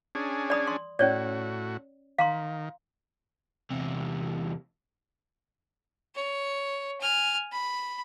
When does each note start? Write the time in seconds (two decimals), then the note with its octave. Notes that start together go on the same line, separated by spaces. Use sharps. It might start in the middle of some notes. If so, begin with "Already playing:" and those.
0.15 C#4 D4 G#4
0.50 D5 B5 D#6
0.67 C6
0.99 A2 C#4 F#4 C#5 D5
2.19 D#3 F5 A#5 C6
3.71 E2 C3
6.15 C#5
7.01 G#5 F6
7.52 B5